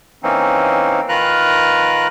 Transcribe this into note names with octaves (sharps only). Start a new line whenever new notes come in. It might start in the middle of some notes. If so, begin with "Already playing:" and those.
E3 A#3 C4 C#4 D#4
D#3 F4 A#4 B4 A#5 F#6